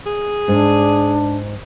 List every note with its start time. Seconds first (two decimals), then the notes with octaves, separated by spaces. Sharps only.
0.06 G#4
0.48 G#2 D4